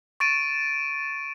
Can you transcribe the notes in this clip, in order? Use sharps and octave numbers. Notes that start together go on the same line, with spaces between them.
C#6 A6 D7 D#7